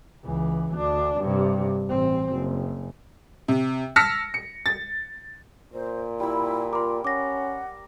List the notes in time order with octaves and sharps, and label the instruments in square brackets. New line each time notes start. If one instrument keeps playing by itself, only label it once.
[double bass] C#2 E3
D2 D4
G2 C3
A1 C4
F#1
[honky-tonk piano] C3
A5 E6 F6 A#6 B6 C#7
C#7
A6
[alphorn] A#2 [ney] C5
[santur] G3 B5 [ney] E4
[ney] F4 [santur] A#4 [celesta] C6 D6
[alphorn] C#4 [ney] F#5 [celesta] D6 A#6